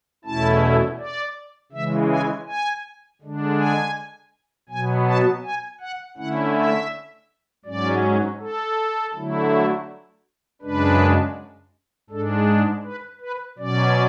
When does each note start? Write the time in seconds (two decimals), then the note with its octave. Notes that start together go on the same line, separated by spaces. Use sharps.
0.24 E2 B2 A3 C#4 E4 A5
0.99 D5
1.72 C#3 E3 G#3 E5
2.10 G#5
2.47 G#5
3.21 D3 G#3 D4
3.58 G#5
4.69 B2 F#3 B3 G#5
5.06 A5
5.44 G#5
5.80 F#5
6.17 D3 A3 C#4 E4 F#5
6.54 E5
7.65 G#2 F#3 C#4 D5
8.40 A4
9.14 D3 F#3 A3 E4
10.62 F#2 C#3 G#3 D4 B4
12.10 G#2 G#3 D4 A4
12.85 B4
13.21 B4
13.58 B2 F#3 C#4 D5